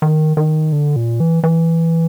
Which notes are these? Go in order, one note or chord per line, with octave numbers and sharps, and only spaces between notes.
D#3
D#3
D3
A#2
E3
E3